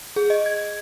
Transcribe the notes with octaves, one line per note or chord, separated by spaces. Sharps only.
G#4
D#5
G#6